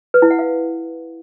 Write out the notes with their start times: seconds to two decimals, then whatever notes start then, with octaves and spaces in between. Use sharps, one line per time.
0.14 B4
0.22 E4
0.31 F#5
0.39 F5